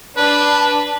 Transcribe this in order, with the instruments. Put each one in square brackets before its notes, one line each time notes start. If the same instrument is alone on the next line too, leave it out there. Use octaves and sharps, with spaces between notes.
[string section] D4 [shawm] B4